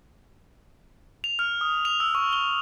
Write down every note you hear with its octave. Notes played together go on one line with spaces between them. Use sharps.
F7
F6
D#6
F7
E6
C#6
G7